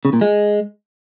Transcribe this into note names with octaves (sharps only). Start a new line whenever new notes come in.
C#3
A#2
G#3